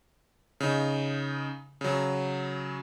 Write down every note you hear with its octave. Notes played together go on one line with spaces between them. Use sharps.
C#3 D#4
C#3 F#3